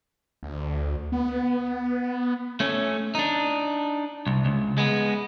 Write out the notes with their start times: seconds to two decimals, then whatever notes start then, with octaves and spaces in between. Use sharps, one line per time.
0.43 D2
1.12 B3
2.60 A3 C#4
3.15 D4 D#4
4.27 C2
4.45 C#2
4.78 G#3 B3